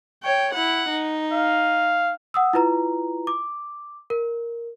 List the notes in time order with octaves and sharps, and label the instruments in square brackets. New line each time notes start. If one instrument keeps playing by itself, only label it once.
[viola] C#5 G5
E4 F#5
D#4
[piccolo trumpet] F5
[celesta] F#5 D#6 E6
E4 F4 B4 A#5
D6
A#4